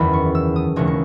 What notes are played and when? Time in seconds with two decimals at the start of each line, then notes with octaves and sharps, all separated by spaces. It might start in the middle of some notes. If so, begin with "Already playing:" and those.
Already playing: F#1 E2 D#3 B5
0.13 C#6
0.35 E6
0.56 D#6
0.76 E1 D#2 C#3 E3 G#3 C#6
0.87 C#6